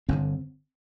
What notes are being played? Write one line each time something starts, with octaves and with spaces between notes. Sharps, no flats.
G1 F2 D3 C4